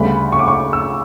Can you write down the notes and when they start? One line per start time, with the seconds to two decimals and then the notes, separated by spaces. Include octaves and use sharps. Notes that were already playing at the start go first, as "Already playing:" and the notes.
Already playing: D2 C#3 G3 B3 B5
0.32 C#6
0.39 D6
0.48 C#6
0.73 E6